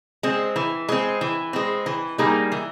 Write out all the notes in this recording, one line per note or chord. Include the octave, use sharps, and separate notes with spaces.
G#3 C4
E3
G#3 C4
E3
G#3 C4
E3
G3 A#3 D#4 G#4
E3